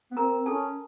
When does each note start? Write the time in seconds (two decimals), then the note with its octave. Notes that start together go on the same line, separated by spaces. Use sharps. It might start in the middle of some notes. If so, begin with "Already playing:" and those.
0.11 B3
0.17 C4 A#4 A#5
0.46 C#4 A4 A5